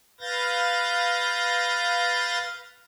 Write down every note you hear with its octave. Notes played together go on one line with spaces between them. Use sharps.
B4 F5 G6 A6 A#6